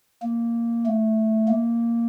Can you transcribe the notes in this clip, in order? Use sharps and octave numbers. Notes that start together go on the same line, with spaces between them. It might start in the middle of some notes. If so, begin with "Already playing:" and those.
A#3
A3
A#3